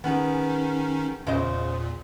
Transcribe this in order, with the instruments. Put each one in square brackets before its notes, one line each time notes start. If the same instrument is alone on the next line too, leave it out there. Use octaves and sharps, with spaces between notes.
[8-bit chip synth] D#3 C#4 D#4 [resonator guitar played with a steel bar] B3 G#4
[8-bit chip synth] E2 A#2 [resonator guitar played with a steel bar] C#3 C5 D#5